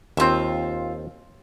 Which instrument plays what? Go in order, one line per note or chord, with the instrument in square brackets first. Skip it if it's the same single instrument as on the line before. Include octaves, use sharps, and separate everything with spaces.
[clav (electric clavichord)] D#2 C4 [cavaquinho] F4 E5